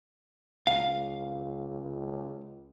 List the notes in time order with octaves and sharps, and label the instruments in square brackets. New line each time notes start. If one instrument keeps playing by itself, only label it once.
[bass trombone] C#2 [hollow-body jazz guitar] F5